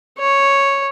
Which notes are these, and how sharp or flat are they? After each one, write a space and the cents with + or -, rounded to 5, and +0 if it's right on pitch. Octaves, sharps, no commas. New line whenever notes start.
C#5 -5